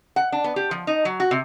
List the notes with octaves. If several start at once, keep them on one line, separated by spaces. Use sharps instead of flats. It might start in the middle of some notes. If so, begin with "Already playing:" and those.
F#5
D4
B3
G4
F3
D#4
F#3
F#4
C3